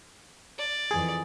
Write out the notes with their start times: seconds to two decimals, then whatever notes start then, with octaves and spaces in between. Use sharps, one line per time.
0.58 D5
0.91 F2 E3 G#4